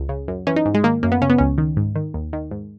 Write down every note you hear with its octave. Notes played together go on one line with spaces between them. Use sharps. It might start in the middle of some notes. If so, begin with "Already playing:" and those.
Already playing: C#2
C#3
F#2
E3 C#4
D#4
G#2
G#3
D#3 A#3
F#2 A#3
B3
C#3 C#4
B3
C#2 C#4
D#3
G#2
D#3
D#2
D#3
G#2